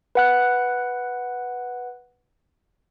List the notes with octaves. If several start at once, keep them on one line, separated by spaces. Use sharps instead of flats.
B4 F#5 F#6